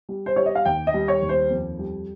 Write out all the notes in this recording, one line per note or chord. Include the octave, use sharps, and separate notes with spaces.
G3
C5
G3 C#5
D#5
F5
D#2 G5
D#5
G3
C#5
D#2
C5
F2
G3